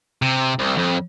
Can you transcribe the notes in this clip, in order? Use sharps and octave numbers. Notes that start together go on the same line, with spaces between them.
C3
C2
F2